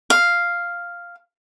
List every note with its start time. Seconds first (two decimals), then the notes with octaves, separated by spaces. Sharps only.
0.10 F5